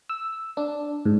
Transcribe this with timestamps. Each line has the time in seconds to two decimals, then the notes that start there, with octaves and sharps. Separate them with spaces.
0.09 E6
0.57 D4
1.05 G#2